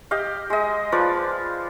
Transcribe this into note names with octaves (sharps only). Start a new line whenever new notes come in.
G4 D#5 F5
G#3 D#5
F3 F4 B4 D5